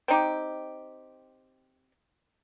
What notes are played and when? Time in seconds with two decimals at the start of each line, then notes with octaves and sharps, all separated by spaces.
0.08 C4 D#4 G4